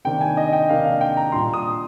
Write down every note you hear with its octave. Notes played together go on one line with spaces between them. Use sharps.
C3 D#3 A#3 D4 G5
G#5
D#5
G5
C3 D#3 A#3 D4 F5
F5
G5
A#5
A#2 G3 D4 C6
D#6